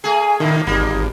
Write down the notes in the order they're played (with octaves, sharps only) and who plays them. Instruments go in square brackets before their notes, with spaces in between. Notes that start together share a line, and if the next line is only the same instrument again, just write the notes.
[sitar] A3 G#4 [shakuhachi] G#5
[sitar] A2 A#3 [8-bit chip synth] D#3 [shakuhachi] E4
[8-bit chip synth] G#1 [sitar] G3 A#3 [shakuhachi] D#4